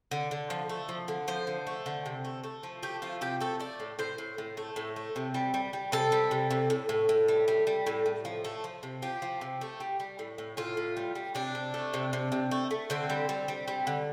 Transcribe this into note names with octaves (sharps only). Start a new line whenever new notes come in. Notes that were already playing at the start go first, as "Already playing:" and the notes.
D3
D3
F3
A3
F3
D3
F3 C5
D3
A3
D3
C3
A3
A3
F3
A3 G4
F3 F4
C3 G4
A3 A4
A3 D5
A2
A2 C5
A2
A2
A3
A2
A3
C3
G3
G3
G3
C3 A4
G3
C3
C3
A2
A2
A2
G3
G3
G3
A2
A2
F3
A3
F3
C3
F3 G4
F3
C3
A3
G3
G3
A2
A2
A2 F4
A2
G3
G3
C3 D4
C3
A3
C3
C3
C3
A3
A3
D3 C4
G3
G3
G3
G3
D3